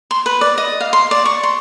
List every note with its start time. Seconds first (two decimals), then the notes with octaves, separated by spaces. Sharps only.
0.11 C6
0.26 B4
0.41 D5
0.58 D#5
0.81 F5
0.93 C6
1.11 D5
1.26 C#6
1.43 C6